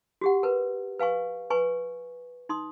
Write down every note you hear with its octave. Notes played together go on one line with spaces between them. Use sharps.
F#4 G4 F#5
A#4 B4
B4 F5 G#5 C#6
B4 G#5 C#6
D#4 C6 D#6